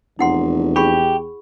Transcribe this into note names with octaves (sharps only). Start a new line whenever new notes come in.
F1 E2 E4 F#5 C6
G4 G#4 B5 C#6